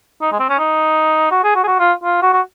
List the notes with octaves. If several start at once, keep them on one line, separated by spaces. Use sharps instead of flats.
D#4
G#3
C4
C#4
D#4
F#4
G#4
F#4
G#4
F#4
F4
F4
F#4
F#4